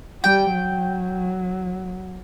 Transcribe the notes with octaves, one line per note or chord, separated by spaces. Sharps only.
G3 G5
F#3